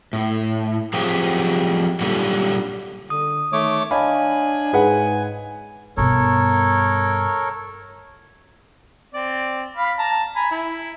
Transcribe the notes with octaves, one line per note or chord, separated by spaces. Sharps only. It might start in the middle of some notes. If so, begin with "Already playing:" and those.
A2
F3 F#3 C4 G4 G#4
A#2 D3 F#3 G3
D3 D#6
D#3 A3 C#5 D6
D4 C#5 D#5 F5 G#5 A5 B5
G#2 G#4 B4 F#5
G2 B2 A4 A#4 C#5
C4 D5
F5 B5
A5 A#5
G#5 A#5 B5
E4